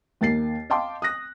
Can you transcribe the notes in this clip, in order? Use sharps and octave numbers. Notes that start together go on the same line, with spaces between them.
D#2 A#3 A6 C7
D#5 F5 G5 A5 C6 D6
D#6 F#6 A#6